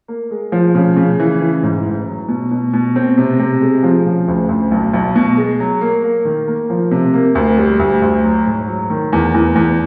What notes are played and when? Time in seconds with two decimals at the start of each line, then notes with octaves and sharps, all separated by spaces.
0.08 A#3
0.31 G#3
0.52 F3
0.75 C#3
0.97 C#3
1.20 E3
1.42 E3
1.63 G#2
1.86 A1
2.07 F#3
2.28 B2
2.51 B2
2.74 B2
2.96 C4
3.18 C3
3.39 C3
3.62 G#3
3.83 F3
4.06 C#3
4.28 D2
4.49 D2
4.71 B1
4.94 B1
5.16 B2
5.37 G#3
5.60 F#3
5.81 A#3
6.04 A#3
6.25 D#3
6.48 A#3
6.70 F3
6.91 C3
7.14 A#3
7.35 D2
7.58 G3
7.80 D2
8.02 D2
8.24 F#3
8.46 G#2
8.68 F#3
8.90 D#3
9.13 E2
9.34 E2
9.56 E2